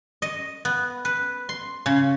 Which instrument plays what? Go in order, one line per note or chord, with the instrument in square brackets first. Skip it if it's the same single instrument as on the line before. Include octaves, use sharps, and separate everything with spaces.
[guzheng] D#5
B3
B4
C6
C#3